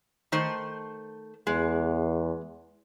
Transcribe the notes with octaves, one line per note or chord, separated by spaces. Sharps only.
D#3 A3 C5
E2 G#3